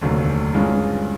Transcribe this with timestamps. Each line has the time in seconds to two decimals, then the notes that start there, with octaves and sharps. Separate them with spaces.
0.01 F1 D#2 D3 F#3 A3
0.53 G2 E3 G#3 C#4 F4